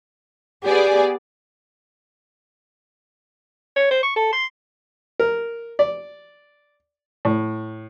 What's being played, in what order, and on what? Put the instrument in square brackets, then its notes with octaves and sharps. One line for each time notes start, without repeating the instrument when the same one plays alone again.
[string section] B3 G#4 D5 [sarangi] G4
[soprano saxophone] C#5
C5
C#6
A4
C6
[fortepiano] A#4
D5
A2